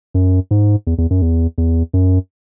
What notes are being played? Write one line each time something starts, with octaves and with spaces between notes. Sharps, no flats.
F#2
G#2
E2
E2
F#2
E2
E2
F#2